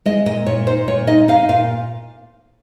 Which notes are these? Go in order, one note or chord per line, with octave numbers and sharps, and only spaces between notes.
G#3 D#5
A#2 D#5
A#2 C#5
D#4 C5
A#2 C#5
D#4 D#5
D#4 F5
A#2 F5